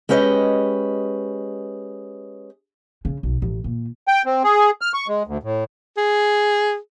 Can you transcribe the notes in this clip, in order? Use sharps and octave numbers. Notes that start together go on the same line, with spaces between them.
G#3 C#4 G4 B4 D#5
C#3
B1
A1
A#2
G5
C4
G#4
F6
C#6
G#3
D2
A2
G#4